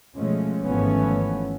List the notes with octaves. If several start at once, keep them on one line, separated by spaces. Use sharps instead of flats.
B2 F3 G#3 A3 C#4
G#1 E3 F3 A3 B3 C#4